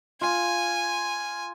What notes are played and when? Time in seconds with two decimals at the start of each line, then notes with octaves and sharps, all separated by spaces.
0.21 F4 G#5